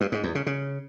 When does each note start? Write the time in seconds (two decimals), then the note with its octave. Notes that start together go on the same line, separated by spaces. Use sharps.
0.01 G2
0.12 G#2
0.24 E2
0.35 C#3
0.46 C#3